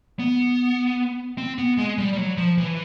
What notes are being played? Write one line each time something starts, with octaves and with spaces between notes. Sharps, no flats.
B3
C4
B3
G#3
G3
G3
F#3
F3
E3